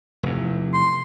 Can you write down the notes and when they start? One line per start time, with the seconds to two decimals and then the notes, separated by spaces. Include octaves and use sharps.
0.23 F1 E2
0.73 C6